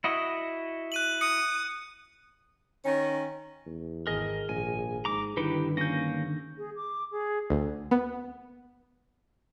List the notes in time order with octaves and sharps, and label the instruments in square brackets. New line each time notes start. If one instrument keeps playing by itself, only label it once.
[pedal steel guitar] E4 F#4 D#5
[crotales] F#6 D#7 F#7
[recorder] D#6 [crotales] C#7
[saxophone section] D#3 C#4
[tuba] E2
[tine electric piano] G#1 G#4 [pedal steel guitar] A#4 D#5
[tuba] A#1 [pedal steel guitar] G#5
[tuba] G#2 [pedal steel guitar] A#5 D6
[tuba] G2 [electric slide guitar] D3 D#3 [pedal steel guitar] D#4 E4 G4 [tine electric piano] B4
[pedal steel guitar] A#3 C#4 [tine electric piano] G6 A#6
[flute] G#4
D6
G#4
[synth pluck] D2
B3